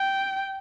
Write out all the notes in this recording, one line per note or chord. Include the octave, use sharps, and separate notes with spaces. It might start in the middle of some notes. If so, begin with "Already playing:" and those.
Already playing: G5